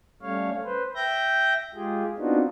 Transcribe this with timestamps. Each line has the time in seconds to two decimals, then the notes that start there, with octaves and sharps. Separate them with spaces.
0.22 G3 A3 C#4 C#5 F5
0.65 B4 C5
0.95 E5 G5 G6 A#6
1.75 G#3 F4 G4 G#4
2.18 B3 C4 D4 D#4 F4 F#4